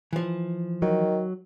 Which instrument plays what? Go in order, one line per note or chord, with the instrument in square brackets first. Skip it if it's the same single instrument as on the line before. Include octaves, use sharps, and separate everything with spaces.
[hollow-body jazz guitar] E3 F3
[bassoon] D#3 [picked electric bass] F#3